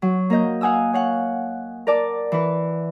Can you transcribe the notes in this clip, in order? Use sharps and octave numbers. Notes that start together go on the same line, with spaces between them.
F#3
A#3 A#4 D#5 G6
F5 F#5 G#5 D#6 E6
C#5 F5 F#5
A#4 D5 A5
E3 B4